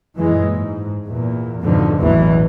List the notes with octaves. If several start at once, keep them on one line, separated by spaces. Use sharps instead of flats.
F#2 A#2 E3 G#3
G#2
E2 A#2
F2 G#2 B2 D3 F3
A1 E2 B2 E3 F#3